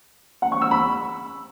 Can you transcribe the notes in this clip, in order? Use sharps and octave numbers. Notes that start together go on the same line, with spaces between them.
F#5
C#6
E6
B5